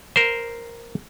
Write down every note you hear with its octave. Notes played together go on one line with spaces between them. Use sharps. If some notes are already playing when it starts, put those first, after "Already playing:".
A#4 C5